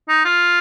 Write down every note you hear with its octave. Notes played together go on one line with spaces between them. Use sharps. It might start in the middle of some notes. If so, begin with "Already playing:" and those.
D#4
F4